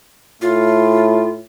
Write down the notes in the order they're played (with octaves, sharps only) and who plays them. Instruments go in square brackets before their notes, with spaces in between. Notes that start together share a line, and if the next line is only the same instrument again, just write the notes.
[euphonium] A2 [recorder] F4